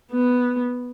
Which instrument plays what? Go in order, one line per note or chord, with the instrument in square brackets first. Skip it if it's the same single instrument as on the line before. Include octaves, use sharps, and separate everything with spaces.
[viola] B3